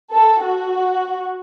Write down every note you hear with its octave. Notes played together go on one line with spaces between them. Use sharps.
A4
F#4